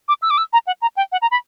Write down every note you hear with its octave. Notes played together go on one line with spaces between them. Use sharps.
D6
E6
D6
E6
A#5
F#5
A#5
G5
F#5
A#5
B5